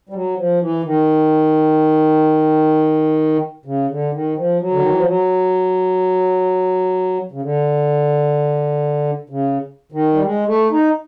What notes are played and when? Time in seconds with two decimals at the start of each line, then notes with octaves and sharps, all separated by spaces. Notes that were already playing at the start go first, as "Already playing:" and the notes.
0.09 G3
0.13 F#3
0.37 F3
0.60 E3
0.84 D#3
3.65 C#3
3.89 D3
4.13 D#3
4.37 F3
4.60 F#3
4.71 D3
4.80 D#3
4.89 E3
4.98 F3
5.07 F#3
7.32 C#3
7.42 D3
9.29 C#3
9.92 D#3
10.13 G3
10.23 G#3
10.47 A3
10.71 D#4